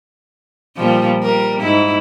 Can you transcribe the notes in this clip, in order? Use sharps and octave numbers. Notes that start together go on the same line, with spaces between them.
A#2 F3 G3
G3 A#4
G#2 E4